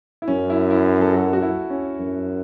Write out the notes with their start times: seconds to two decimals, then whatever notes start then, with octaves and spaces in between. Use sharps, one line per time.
0.22 E4
0.28 F#2 C#4
0.50 E4
0.70 E4
1.01 A4
1.13 F#4
1.33 F#4
1.42 E4
1.70 C#4
1.99 F#2